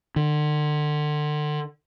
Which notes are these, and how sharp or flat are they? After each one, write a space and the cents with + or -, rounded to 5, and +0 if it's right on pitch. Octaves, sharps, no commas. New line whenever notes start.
D3 +35